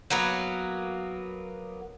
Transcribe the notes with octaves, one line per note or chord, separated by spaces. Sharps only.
F#3 A#3 B3